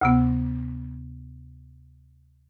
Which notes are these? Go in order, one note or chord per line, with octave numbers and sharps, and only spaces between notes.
D2 C3 B3